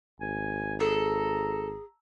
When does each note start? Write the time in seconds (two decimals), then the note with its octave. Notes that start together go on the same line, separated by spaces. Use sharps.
0.21 G#1 G#5
0.80 G#4 A4 A#5